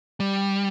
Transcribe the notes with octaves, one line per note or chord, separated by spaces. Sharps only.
G3